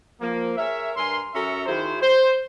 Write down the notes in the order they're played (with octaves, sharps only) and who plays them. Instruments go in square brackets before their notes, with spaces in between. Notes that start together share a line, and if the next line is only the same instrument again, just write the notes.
[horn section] F3 A#3
G#4 A#4 C#5 E5
G2 A#4 G#5 C6
F#2 C#4 F#4 A4 E5 A#5
D#3 E4 F#4 G#4 C5
C5